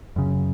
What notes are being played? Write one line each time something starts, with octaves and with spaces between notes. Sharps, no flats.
F#2 C#3